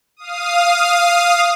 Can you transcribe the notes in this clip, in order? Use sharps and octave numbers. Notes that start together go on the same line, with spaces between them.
F5 D#6